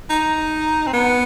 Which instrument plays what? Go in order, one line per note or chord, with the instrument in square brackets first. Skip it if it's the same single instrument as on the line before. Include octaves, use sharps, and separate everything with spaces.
[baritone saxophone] D#4
C4
B3